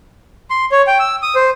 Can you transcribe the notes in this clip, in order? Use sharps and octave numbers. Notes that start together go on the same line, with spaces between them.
C6
C#5
G5
E6
D#6
C5